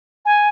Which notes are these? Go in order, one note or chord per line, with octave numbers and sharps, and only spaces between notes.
G#5